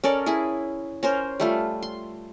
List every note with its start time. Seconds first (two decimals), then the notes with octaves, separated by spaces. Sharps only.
0.04 C#4 A4 A#4 D5
0.26 E4 G#4
1.03 C#4 A#4 C5
1.40 G3 A3 F4
1.83 C6